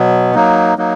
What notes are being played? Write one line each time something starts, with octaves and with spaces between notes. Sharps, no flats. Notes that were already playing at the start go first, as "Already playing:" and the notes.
Already playing: B2 F#3 B3
F#3 A#3 D#4
F#3 A#3 D#4